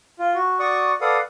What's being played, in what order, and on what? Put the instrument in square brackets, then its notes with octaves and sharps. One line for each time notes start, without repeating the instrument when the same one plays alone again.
[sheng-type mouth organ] F4
F#4
F#4 D5 C#6 D#6
A4 B4 D5 F5 F#5 D#6